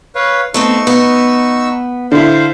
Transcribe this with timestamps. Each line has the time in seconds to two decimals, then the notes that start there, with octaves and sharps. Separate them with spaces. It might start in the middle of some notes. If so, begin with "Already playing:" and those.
0.15 B4 C#5 F5
0.54 A3 B3 C4 D#4 C#6 E6
0.87 B3
2.12 D3 E4 C5 F5